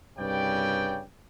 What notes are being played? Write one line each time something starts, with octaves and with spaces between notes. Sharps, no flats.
C2 G2 C#3 B4 D5 G5